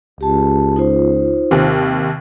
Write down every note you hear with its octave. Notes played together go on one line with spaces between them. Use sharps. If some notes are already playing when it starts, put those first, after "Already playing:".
C#2 G4 A5
D#4 F4 C5
D#2 C3